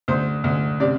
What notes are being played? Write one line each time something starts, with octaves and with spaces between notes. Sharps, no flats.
D2 C5
D2
C3 D5